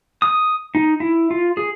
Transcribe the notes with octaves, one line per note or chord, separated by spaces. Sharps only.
D#6
D#4
E4
F4
G#4